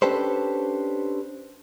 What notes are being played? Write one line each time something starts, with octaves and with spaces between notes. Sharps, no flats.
C#4 D4 G4 A4 B4 C5